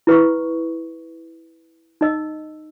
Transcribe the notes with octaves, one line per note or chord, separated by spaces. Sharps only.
E4 B4 B5 C#6
D#4 D#5 E6